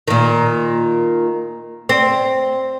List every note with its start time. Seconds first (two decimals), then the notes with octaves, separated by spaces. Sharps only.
0.08 A#2 D#3
1.89 C4